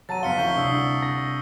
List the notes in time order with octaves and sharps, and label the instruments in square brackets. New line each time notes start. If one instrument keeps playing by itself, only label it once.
[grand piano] F#3 A5 A#5 [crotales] A6 D#7
[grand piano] F#1 F2 C6 [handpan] F5 [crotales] B6 C#7 G7
[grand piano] D2 E4 [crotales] C#6 G6 G7
[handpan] C3 D4 [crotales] D#6 E6 C7
[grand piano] A#6